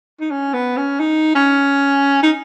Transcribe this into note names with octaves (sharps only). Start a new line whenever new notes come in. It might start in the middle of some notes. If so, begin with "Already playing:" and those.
D#4
C#4
B3
C#4
D#4
C#4
D#4